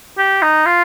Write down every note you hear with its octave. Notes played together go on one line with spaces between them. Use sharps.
G4
D#4
F4